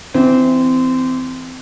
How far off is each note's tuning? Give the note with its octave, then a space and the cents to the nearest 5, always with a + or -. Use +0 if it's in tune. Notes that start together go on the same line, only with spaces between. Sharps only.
E3 -5 C4 -25